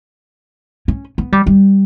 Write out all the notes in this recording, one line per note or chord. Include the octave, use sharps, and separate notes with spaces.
C#4
B3
G3
G3